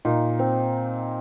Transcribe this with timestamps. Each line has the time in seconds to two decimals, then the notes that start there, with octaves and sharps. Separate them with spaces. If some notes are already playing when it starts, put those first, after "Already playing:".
0.05 A#2 D#4
0.39 C4